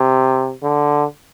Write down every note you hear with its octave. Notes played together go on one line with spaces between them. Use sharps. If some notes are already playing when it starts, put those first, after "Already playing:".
Already playing: C3
D3